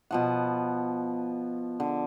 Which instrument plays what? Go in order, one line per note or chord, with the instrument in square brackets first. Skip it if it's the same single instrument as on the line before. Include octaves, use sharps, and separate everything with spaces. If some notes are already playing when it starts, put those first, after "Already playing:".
[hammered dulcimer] B2 F3 F#5
D3